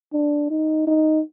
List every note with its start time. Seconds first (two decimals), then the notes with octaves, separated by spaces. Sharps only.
0.13 D4
0.50 D#4
0.87 D#4